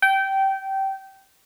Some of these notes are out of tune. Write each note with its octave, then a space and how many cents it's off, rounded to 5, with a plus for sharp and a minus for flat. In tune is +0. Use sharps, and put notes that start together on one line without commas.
G5 -20